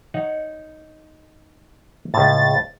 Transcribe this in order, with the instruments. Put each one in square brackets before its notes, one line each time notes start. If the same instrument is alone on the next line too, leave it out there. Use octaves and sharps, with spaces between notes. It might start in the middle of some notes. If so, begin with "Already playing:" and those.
[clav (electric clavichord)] D#4 C#5 F#5
[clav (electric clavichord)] C#2 A2 [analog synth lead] A6